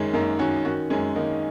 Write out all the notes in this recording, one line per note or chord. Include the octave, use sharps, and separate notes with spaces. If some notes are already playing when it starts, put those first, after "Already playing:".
Already playing: F#2 D#3 G#3 C#4
F#2 A#3 D#4
D#3 C#4 F#4
D#3 C#4 F#4
F#2 G#3 C#4
D#3 A#3 D#4